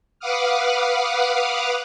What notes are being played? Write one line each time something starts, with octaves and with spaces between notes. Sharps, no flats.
B4 F5 F#5 D6 D#6 F6